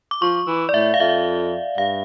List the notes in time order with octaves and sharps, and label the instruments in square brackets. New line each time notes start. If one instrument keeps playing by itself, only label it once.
[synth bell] D6
[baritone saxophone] F3 [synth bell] C#6
[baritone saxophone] E3
[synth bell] D5
[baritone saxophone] A2 [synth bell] E5
[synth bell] F5
[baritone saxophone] F2 [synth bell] E5
[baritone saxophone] G2 [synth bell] F5